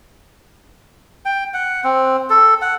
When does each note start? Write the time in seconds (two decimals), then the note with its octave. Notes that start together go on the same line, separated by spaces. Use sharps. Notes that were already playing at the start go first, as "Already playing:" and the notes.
1.25 G5
1.54 F#5
1.84 C4
2.30 A4
2.62 F#5